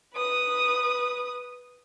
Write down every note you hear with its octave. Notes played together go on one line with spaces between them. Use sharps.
B4 D#6